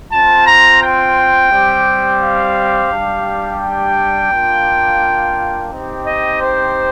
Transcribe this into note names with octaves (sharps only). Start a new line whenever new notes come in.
C4 F4 A5
A#5
G5
G3 C4 G4
F5
G3 D4 G4
G5
A#3 D4 F4
C4 D#4 G4
D#5
C5